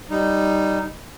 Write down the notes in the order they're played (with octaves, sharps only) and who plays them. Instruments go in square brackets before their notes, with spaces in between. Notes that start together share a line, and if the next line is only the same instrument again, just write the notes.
[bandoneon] G3 D#4